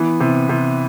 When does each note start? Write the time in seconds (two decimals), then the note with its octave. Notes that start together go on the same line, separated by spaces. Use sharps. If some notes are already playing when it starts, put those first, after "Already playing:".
Already playing: E3 B3
0.20 C3
0.49 C3